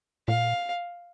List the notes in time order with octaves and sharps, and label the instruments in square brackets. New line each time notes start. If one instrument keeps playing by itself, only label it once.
[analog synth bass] A#2 [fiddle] F5